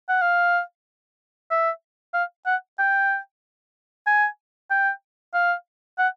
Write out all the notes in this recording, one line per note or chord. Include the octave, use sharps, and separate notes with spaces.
F#5
F5
E5
F5
F#5
G5
G#5
G5
F5
F#5